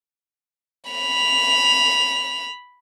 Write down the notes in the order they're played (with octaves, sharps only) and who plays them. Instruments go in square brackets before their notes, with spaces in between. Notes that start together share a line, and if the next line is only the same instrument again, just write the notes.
[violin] B5 F7